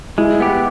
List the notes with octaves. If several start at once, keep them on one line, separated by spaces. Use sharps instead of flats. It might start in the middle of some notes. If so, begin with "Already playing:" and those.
G#3 E4
B3 G4